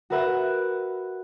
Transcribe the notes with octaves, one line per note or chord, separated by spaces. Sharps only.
F#4 A#4 B4 E5 F#5